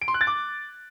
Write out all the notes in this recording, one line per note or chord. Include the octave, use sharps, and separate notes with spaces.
D7
C6
F#6
A6
D6